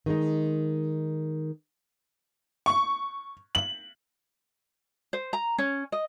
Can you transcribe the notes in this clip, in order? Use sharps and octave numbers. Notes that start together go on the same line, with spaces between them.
D#3 G#3 D#4
C#6
F#7
C5
A#5
C#4
D#5